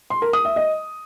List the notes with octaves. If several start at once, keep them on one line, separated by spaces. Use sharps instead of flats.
C6
A#4
D#6
E5
D#5